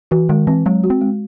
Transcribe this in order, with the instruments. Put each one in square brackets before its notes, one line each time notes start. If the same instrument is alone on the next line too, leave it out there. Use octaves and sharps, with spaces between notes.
[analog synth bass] E3 [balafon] F#4
[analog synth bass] D#3 [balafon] G#3
[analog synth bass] E3 [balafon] C4
[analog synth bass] F#3 [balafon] G#3
[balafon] F#4
[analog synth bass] C4
[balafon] G#3